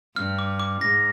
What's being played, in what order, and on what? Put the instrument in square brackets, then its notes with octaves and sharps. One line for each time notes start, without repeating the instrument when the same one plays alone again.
[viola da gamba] G2 [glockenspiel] F6
[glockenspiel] D6
D6
[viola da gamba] G#2 [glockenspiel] A#6